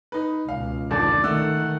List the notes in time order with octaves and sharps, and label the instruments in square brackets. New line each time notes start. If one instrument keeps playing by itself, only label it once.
[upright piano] D#4 B4
[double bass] C#2 B2 [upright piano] F5
[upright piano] G#1 F2 D3 [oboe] D5
[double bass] D#3 [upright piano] A3 E6 [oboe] F#5